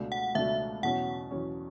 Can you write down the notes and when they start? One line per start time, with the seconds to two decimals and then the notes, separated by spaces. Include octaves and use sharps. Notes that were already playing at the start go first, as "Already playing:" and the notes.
Already playing: C#2 B2 A3 D4 F#4
0.12 F#5
0.35 C#2 B2 A3 D4 F#4 E5
0.83 E2 B2 F#3 C#4 F#5
1.31 E2 B2 F#3 C#4